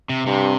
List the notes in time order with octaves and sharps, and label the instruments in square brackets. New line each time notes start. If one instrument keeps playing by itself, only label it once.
[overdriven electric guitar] C3
[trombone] G2 [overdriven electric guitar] C3